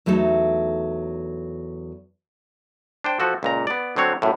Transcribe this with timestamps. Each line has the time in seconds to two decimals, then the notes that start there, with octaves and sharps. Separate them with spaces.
0.06 E2 F#3 A3 D#4 A4
3.04 D4 C5 G5
3.20 F3 F#4 A4
3.43 C#2 A#2 A#5
3.67 B3 D5
3.96 D3 F#3 C4 C#5
4.22 F#2 A2